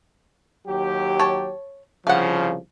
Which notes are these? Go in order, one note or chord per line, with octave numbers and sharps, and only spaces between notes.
D#2 F#3 G4
C#5 A5
C2 C#3 F3 F5 F#5